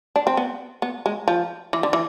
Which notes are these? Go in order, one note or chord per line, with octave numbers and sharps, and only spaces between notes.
D4
C4
B3
B3
G#3
F3
E3
D3
E3